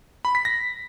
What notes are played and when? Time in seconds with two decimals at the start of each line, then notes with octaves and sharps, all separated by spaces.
0.25 B5
0.35 B6
0.45 A#6